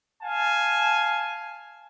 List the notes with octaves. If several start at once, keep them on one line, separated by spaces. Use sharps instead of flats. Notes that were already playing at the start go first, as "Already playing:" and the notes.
F5 G#5 A5